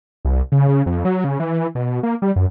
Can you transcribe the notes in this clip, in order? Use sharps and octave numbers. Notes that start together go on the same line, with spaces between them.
C2
C#3
C#3
F2
F#3
C#3
E3
B2
A#3
G3
F#2